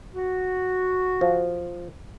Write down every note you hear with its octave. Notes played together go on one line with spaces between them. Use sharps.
F#4
F3